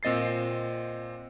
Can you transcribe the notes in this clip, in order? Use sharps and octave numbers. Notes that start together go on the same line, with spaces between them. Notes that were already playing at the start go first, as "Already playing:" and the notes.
A#2 C4 D#5 A6 C7